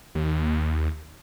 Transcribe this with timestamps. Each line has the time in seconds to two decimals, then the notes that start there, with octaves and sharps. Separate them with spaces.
0.15 D#2